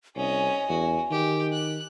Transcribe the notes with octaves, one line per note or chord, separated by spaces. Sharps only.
C2 C#4 D#5 G#5
E2 F#4
D#3 G4
F#6